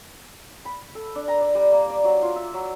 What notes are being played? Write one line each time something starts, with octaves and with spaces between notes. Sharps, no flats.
B5
A4
D4
A#5
D5
G3
A#3
D5
F#3
F4
E5
F#3